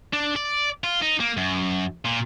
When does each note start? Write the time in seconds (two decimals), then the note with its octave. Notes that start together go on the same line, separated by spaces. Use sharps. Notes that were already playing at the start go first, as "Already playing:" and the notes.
0.13 D4
0.36 D5
0.84 F4
1.02 D#4
1.20 A#3
1.37 F#2
2.05 A#2